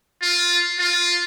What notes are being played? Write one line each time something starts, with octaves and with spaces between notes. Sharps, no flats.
F4
F4